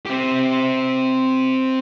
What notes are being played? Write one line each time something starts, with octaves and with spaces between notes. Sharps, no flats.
C4 G4